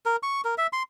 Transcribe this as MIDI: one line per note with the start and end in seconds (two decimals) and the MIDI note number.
0.06 0.16 70
0.23 0.41 85
0.45 0.55 70
0.58 0.67 76
0.73 0.83 84